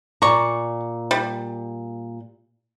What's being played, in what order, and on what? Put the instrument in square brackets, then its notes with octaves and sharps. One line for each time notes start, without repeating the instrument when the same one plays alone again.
[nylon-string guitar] A#2 D5 [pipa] A#5 C#6
[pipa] G3